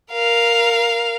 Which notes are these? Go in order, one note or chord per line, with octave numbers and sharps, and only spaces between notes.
A#4 F5